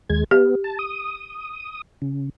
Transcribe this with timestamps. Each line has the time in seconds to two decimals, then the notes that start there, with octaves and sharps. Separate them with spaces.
0.09 D#2 G#3 G#6
0.31 B3 G4
0.64 A5
0.79 D#6
2.02 C#3